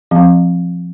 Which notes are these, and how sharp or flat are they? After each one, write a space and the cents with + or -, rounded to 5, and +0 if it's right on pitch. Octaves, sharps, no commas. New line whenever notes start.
F3 +0 C4 +20 F5 +10